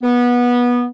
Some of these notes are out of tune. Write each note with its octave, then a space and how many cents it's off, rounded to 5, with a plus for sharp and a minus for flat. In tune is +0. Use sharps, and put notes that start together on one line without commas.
B3 -20